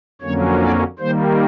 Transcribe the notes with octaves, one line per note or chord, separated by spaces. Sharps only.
F2 D3 F#3 A#3 C#4 C#5
D5
D#3 G3 A#3 C5